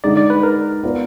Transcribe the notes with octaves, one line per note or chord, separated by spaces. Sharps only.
D3 G#3 D#4 D5
D5
B4
A#4
B3 F4 B4 D5